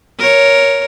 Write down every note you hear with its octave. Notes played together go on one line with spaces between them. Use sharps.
A#4 C#5